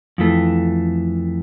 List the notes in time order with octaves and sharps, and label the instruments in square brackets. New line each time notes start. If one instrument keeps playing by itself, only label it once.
[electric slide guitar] F2 E3 A3